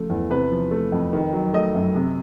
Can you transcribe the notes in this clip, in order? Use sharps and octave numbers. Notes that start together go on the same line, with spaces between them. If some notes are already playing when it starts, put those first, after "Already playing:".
Already playing: C#3 F3 A3
E2
C3 B4
F3
A3
F2
D#3
F#3
A3 D#5
F#2
C3